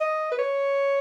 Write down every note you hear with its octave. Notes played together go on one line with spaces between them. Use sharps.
D#5
B4
C#5